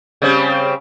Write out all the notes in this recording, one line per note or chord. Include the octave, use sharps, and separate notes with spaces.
C#3 G3 C4